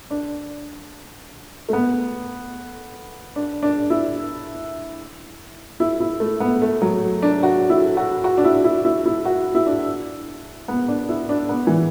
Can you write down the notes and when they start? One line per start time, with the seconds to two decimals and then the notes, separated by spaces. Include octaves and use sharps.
0.10 D4
1.69 A3
1.73 B3
3.36 D4
3.63 D4
3.90 E4
5.80 E4
6.00 E4
6.20 A3
6.40 B3
6.62 A3
6.82 F#3
7.22 D4
7.43 F#4
7.70 E4
7.97 F#4
8.24 F#4
8.38 D4
8.45 E4
8.64 E4
8.85 E4
9.06 E4
9.25 F#4
9.55 E4
9.66 D4
10.68 B3
10.88 D4
11.09 E4
11.29 D4
11.49 B3
11.67 E3